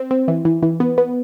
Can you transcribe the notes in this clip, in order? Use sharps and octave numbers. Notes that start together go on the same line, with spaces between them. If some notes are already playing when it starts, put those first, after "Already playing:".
Already playing: C4
C4
E3
E3
E3
B3
B3